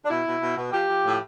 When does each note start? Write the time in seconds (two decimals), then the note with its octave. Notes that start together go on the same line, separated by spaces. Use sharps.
0.05 D4
0.09 B2 E4
0.25 B2
0.40 B2
0.57 B2
0.72 F3 G4
0.88 F3
1.05 A2